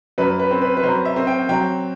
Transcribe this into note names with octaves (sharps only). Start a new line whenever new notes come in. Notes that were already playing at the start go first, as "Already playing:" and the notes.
F#2 B4
B4
C4
B4
B4
F#3 C5
E5
C4
G5
F#3 G5